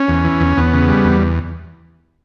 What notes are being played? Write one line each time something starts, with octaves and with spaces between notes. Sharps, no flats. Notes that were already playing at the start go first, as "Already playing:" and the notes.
Already playing: C#4
E2
E3
E2
E2 B3
C#3
G3
E2